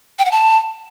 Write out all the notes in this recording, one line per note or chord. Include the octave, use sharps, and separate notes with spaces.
G5
F#5
A5